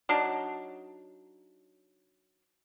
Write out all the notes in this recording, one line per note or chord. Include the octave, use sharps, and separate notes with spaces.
F#3 D4 D#4